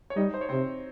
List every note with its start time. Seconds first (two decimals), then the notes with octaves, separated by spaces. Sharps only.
0.10 C#5
0.16 G3 D#4 D#5
0.34 C5
0.41 C#5
0.49 C3 C4 C5